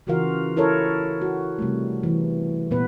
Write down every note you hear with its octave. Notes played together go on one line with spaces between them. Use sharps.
C#3 E3 F4 F#4 A#4 F5
E4 A4 A#4 C#5
F#4
C3 G3 A3
E3
A#2 B3 B4